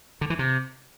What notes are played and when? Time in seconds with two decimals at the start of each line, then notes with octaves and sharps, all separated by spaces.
0.21 D3
0.30 E3
0.39 C3